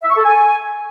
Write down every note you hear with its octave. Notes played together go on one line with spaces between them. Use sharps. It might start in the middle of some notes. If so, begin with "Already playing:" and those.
E5
C#6
A4
G#5